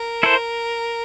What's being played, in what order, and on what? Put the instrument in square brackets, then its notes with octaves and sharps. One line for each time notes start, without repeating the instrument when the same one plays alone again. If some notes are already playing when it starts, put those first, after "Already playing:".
Already playing: [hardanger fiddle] A#4
[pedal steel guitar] E4 A4 C5